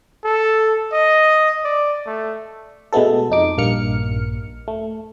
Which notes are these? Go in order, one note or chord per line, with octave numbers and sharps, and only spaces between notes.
A4
D#5
D5
A3
B2 G#3 A3 B3 A4
F2 D#4 D6
A#1 G2 A#3 F6 C#7
A3